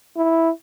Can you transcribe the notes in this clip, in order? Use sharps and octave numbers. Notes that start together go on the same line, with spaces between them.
E4